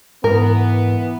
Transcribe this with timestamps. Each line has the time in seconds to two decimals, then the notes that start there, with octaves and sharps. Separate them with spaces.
0.24 G#2 E3 B3 A#4